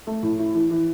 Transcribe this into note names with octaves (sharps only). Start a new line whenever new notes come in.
A3
A2
E4
E3
E3